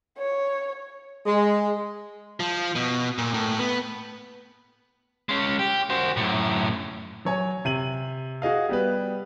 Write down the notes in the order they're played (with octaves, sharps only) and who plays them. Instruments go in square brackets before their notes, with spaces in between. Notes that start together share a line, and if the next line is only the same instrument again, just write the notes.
[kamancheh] C#5
[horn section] G#3
[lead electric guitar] F3
B2
A#2
A2
B3
[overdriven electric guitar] G#3 C#4
G4
F#4 C5
F#2 A2
[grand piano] F#3 C#5 G#5
C3 D#7 F#7
F#4 G#4 D#5 F5
G3 B3 B4